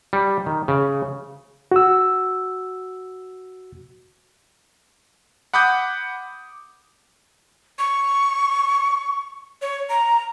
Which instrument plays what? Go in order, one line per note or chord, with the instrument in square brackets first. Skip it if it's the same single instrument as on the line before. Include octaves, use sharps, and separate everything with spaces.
[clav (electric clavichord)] G3
D#3
C#3
[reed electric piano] F#4 E6
[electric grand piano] F#5 B5 D6 D#6 G6
[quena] C#6
C#5
A#5